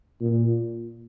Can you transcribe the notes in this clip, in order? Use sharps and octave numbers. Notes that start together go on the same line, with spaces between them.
A#2